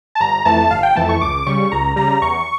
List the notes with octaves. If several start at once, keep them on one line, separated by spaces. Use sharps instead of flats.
A5
G1 A#5
F2 E3 A3 A5
G1 F5
G5
F2 E3 A3 A5
C#6
C#2 D6
C#3 G3 C#6
C#2 A#5
C#3 G3 A#5
E2 C#6